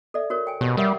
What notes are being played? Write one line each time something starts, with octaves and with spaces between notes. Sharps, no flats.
A4 D5 E5
F#4 A#4 C#5
G5 G#5
B2 G4 C#5
G3 A#4 E5 F#5